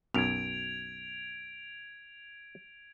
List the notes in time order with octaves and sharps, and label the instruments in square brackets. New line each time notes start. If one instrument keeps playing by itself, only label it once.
[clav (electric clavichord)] B1 F#2 [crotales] G#6 D7 F7